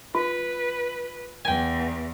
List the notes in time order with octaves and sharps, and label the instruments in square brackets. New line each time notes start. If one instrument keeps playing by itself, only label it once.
[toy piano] F4 [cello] B4
[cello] E2 [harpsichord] G5 G#5